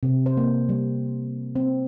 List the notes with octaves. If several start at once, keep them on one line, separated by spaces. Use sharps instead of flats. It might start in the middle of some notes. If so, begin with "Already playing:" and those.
C3
C5
A#3
G3
C4